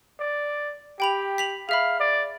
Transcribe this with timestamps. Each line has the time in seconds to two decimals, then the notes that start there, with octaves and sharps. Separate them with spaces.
0.20 D5
1.00 G4 G5 B5 F7
1.38 B6 F7 F#7
1.69 G#4 E5 F5 B5
2.00 D5